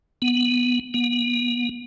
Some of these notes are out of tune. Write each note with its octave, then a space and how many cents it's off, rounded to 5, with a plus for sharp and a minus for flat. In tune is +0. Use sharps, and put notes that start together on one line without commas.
B3 -5
B3 -40